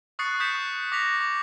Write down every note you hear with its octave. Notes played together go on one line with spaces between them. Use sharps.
C#6 D#6 F#6 A6 C7 C#7
D#6 G6 B6 C#7 E7
D6 A#6 B6 F7
D6